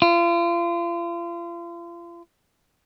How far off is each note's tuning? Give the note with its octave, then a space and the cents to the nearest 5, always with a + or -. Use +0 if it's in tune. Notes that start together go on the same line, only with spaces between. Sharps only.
F4 -35